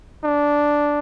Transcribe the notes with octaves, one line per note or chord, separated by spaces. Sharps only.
D4